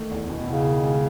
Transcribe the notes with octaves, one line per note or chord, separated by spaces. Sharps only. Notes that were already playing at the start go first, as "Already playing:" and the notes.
Already playing: D#3 A3
E2
B2
C#3 E4
D#3
G#3